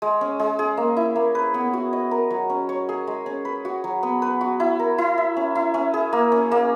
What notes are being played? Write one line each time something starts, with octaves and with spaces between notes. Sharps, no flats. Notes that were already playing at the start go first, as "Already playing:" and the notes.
G#3
C#4
G#3
G#4
A#3
E4
A#3
B4
B3
F#4
D#5
A#4
F#3
C#4
C#5
G#4
G#3
C#4
B4
F#4
F#3
B3
B4
F#4
E4
A#4
E4
E5
C#4
E4
C#4
G#4
A#3
C#4
A#3